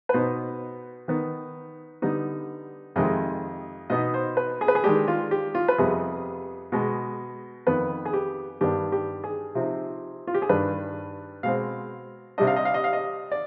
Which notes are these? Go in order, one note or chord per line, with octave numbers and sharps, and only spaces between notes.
B4
B2 B3 D#4 C5
D#3 B3 D#4
D3 G3 B3 D#4
F2 C3 D#3 G#3 D#5
B2 B3 D#4 D#5
C5
B4
G#4
B4
G#4
D#3 G#3 D4 G4
F4
G4
F4
B4
F2 C3 G3 B3 G#4
B2 G#3 B3
F2 D#3 B3 B4
G#4
G4
G2 D#3 B3 D4 G4
G4
G#4
C3 F3 C4 D#4
F4
G4
G#4
G2 D#3 G3 D4 B4
B2 G#3 C4 F5
C3 G3 D4 D#5
F5
D#5
F5
D#5
F5
D#5
D5